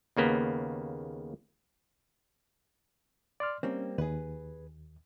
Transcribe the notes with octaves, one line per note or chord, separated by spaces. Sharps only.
D#2 C#3 A#3 B3
D5 C6 F6
G3 A#3 C4 C#4
D#2 G#4 B4